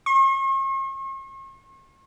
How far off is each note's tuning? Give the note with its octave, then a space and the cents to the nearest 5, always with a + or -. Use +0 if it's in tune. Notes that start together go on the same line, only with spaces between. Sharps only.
C#6 -45